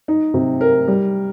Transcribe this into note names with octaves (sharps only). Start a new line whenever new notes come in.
D#4
C3
A#4
G3